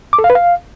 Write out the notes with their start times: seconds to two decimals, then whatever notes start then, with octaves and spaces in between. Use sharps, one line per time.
0.13 D6
0.19 A4
0.24 F5
0.30 B4
0.35 F5